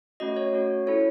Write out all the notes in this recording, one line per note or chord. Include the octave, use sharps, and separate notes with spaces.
A3 C#4 F#4 D#5
C#5
A3 C#4 F#4
C#4 E4 A4 C#5